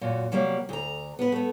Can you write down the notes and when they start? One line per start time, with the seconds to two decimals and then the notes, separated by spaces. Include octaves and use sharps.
0.01 F#2 A#2 F#4
0.32 C3 F#3 G3 A#3
0.69 D2 A#5
1.19 B3 B4
1.32 A3 B3